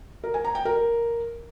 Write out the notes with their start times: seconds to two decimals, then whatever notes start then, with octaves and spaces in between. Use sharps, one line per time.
0.24 A#4
0.34 G#5
0.44 A#5
0.55 G5
0.65 A#4